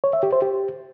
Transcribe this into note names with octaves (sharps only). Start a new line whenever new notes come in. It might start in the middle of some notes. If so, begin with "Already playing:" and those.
C#5
E5
G4
C5
G4